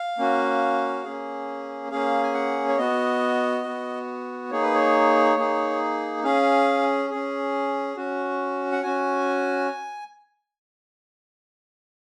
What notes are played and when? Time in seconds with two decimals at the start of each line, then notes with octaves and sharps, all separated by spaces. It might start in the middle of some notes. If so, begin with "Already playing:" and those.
Already playing: F5
0.18 A#3 C#4 F#4
1.04 A#3 C#4 G#4
1.91 A#3 C#4 G#4 F5
2.23 G#5
2.34 F#5
2.68 C#5
2.78 B3 F#4 D#5
3.64 B3 F#4
4.51 A#3 D#4 G#4 C#5
4.62 B4
4.74 C#5
5.37 A#3 D#4 G#4
6.24 C#4 G#4 F5
7.10 C#4 G#4
7.97 C#4 F#4
8.72 F#5
8.83 C#4 F#4 G#5